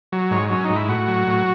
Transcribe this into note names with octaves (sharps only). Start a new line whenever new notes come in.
F#3
G#2 C#5
F#3 C#4
D#4
G#2
E4
A2 F#4
F#3
A2